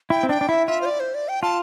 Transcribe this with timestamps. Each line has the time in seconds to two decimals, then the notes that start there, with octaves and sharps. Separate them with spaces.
0.10 E4 G5
0.23 C4
0.29 D4 G5
0.41 D4
0.49 E4 E5
0.67 F4 E5
0.82 C5
0.86 D5
1.00 C5
1.15 D5
1.28 G5
1.42 F4 A5